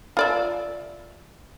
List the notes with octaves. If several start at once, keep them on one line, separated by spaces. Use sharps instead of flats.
F4 D5 E5